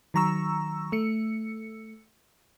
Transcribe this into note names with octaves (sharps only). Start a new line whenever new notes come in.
D#3 F#3 A#5 C#6 E6
A3 C#7